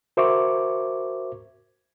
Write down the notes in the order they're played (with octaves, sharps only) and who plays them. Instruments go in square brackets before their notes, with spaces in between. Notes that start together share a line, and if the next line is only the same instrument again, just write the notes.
[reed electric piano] F#4 A#4 C5 E5 C#6 D6